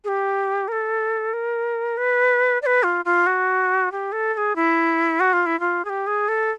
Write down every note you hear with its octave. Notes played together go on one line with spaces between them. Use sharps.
G#4
G4
A#4
A4
A#4
B4
D5
B4
F4
F4
F#4
G4
A4
A4
G#4
E4
F#4
F4
E4
F4
G#4
G4
G#4
A4